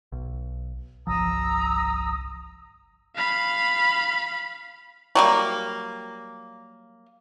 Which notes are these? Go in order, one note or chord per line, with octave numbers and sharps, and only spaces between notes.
B1
G1 C2 F3 A#5 D#6 E6
F5 B5
F#3 G3 A#3